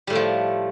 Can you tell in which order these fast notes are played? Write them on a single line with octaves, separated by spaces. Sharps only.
G3 A2 A3 F3